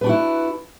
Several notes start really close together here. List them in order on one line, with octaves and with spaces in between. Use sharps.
B4 D4 F#4 E4